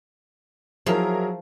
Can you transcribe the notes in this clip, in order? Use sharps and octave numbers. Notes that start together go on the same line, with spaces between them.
F3 F#3 E4 G#4 A#4 A#5